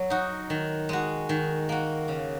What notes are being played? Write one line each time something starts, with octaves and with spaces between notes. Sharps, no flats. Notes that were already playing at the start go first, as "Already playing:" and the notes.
Already playing: F#3
D#4 F#4
D#3
G#3 F#4
D#3
A#3 F#4
C#3